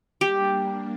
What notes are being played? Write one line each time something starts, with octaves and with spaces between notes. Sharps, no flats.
G3 A#3 D4 G4